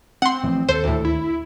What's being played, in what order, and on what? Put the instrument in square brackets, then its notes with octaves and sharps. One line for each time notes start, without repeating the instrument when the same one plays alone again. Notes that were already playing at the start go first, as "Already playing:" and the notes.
[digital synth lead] C4 [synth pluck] F#5 C6
[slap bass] A1 E3 F3
[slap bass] D#2 [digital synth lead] A4 [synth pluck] C5
[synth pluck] D2 A2
[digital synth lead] E4